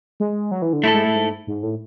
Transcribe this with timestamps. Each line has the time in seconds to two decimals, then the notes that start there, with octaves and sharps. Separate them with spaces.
0.20 G#3
0.51 F#3
0.62 E3
0.73 D3
0.83 A2 A3 E4 A4
0.94 G#2
1.05 A2
1.15 G#2
1.47 G#2
1.63 A2